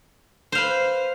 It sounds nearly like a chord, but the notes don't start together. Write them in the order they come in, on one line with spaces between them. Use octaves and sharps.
C5 F5 B4